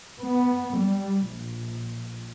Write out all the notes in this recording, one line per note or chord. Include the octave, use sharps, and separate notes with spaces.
B3
G3
A#1